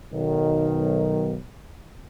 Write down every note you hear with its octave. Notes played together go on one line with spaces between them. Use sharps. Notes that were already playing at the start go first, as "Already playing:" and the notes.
B1 D#3